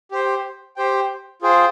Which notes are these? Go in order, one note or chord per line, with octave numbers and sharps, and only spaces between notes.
G4 C5 G5
G4 C5 G5
F4 G#4 C5 G5